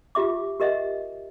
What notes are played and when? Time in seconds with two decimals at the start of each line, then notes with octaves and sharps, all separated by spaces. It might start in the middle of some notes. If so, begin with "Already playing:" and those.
0.15 F4 G4 E5 D6
0.60 G4 A#4 D#5 E5 F#5